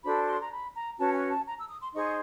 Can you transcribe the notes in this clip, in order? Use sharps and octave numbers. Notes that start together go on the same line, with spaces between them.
D4 F#4 A4 C5 B5
C6
A#5
B5
A#5
C#4 F#4 B4 A5
G#5
A5
A#5
E6
D#6
C6
D#4 G#4 C5 C#6